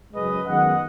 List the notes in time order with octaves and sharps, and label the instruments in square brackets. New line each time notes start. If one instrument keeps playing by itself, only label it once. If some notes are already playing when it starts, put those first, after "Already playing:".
[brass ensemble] F#2 C#3 G#3 B4 D#5
F#2 D#3 G#3 B3 D#5 F#5